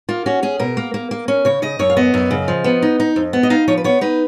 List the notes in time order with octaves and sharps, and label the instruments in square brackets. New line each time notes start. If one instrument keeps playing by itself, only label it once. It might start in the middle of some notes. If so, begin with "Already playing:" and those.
[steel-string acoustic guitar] A#3 F4
C#4 F#4
C#4 G#4
B2 A#4
A#3
A#3
A#3
C#4
C#3 C#5
C#3 D#5
F#2 C#5
F5
B3 D#5
F#2
C#3
F3
B3
D#4
D#4
F2
B3
D#5
D#4 F5
F3 C#5
B4
B3 C#5
D#4 B4